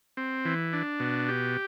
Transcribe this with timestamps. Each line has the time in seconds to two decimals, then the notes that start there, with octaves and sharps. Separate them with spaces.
0.17 C4
0.45 E3
0.73 D4
1.00 B2
1.29 G4